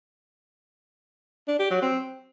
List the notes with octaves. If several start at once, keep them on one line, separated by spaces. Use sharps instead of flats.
D4
G4
F#3
C4